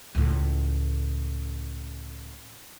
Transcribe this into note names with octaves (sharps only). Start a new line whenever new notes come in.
C#2 A2